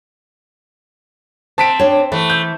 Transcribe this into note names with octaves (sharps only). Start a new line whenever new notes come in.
C4 A5 B6 D7
D4 C#5
E3 A3
G6